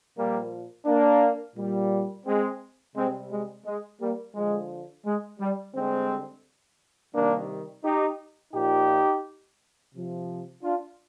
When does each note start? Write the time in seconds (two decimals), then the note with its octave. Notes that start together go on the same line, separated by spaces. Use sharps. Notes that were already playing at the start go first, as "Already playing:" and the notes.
0.16 A#2 F3 G3 A#3
0.86 A#3 D4
1.56 A#2 G3
2.26 G#3 C4
2.95 C3 G3 G#3 C4
3.31 G#3
3.65 G#3
4.00 G3 A#3
4.35 D3 F3 G#3
5.05 G#3
5.39 G3
5.74 D3 G3 G#3 C4
7.14 C3 D#3 G3 A#3 D4
7.84 D#4 G4
8.54 A#2 F3 D#4 G4
9.93 C3 F3
10.63 D4 F4